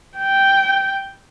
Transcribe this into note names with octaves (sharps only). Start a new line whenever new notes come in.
G5